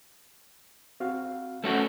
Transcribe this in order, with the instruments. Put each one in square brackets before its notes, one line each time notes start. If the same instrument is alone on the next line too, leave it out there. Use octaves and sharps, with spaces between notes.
[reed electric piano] C4 F#4 F5
[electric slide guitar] A3 C#4 F#4